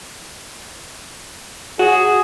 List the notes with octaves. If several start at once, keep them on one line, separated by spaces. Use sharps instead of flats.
F#4 G#4